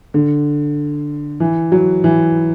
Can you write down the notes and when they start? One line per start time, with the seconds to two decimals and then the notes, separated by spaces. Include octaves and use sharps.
0.14 D3
1.40 E3
1.72 F#3
2.04 E3